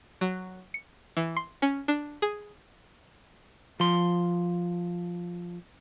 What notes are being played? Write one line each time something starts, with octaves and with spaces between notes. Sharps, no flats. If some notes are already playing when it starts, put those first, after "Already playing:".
F#3
C#7
E3
C6
C#4
D4
G#4
F3 C6